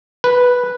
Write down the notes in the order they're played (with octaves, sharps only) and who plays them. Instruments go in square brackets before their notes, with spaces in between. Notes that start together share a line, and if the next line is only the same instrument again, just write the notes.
[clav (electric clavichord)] B4